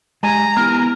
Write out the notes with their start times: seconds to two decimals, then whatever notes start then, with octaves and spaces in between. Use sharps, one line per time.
0.23 G#3 G4 G#5 A#5
0.57 B3 E4 G4 A#4